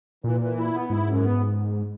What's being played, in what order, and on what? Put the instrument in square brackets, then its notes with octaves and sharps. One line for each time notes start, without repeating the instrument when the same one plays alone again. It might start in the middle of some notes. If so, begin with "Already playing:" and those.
[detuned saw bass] A#2 [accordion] E3
[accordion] E3
E4
B3
[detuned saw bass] G#2 [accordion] E4
[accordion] F#2
B3